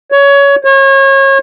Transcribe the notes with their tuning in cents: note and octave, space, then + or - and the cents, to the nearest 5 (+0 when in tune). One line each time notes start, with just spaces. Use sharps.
C#5 +20
C#5 -30